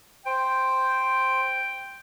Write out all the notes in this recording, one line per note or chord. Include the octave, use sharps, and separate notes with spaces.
C5 G5